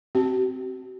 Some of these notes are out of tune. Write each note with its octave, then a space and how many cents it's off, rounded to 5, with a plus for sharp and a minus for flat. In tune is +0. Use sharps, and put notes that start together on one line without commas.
C4 +0 F#4 +45